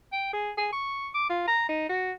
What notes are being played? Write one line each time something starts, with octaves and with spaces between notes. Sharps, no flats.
G5
G#4
G#4
C#6
D6
F4
A#5
D#4
F#4